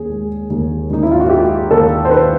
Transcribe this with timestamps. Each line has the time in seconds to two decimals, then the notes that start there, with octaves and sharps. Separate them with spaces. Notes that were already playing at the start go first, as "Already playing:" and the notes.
Already playing: D#2 G#4
0.09 G#3
0.50 D#2
0.90 D#2 D#4
1.03 E4
1.11 F4
1.20 F#4
1.30 G#3 G4
1.70 D#2 A4
2.05 C5
2.10 D#3 B4